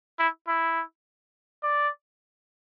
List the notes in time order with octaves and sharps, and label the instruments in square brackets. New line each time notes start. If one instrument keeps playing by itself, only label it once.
[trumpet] E4
E4
D5